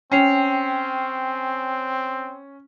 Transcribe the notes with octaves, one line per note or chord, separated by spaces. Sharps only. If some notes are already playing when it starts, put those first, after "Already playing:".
C4 C#4 G5 C7 F7